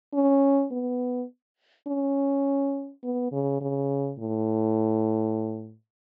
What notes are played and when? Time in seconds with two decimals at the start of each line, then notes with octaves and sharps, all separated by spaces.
0.14 C#4
0.72 B3
1.88 C#4
3.04 B3
3.32 C#3
3.62 C#3
4.19 A2